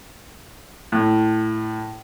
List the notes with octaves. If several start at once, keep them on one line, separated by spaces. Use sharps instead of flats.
A2